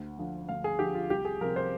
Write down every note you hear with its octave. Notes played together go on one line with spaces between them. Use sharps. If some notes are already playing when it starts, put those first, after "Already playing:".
Already playing: D2
D3 F3
D2 F5
G#4
D3 F3 G4
F4
C2 G4
G#4
C3 F3 A#4
C5